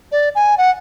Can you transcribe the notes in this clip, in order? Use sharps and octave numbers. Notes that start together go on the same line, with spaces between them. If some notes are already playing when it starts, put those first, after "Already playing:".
D5
G#5
F#5